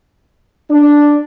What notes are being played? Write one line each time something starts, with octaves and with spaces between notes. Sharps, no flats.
D4